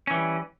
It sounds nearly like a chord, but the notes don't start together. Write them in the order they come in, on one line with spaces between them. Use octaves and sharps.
C#4 E3 G3